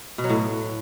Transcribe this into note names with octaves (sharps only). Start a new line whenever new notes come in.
B2
F#3
A2